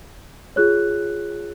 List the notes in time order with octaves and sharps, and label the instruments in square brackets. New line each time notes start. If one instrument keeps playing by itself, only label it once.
[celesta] F4 G#4 C#5 F#6